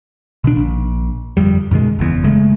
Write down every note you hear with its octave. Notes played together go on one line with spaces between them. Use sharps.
B2 D#3 D4
A#1
G1 F2 G3
F#2 B2 D#3 G#3
F#1 E2
F#1 C#3 G#3 A3